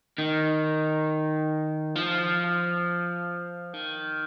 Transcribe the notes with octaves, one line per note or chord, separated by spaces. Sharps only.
D#3
F3
D#3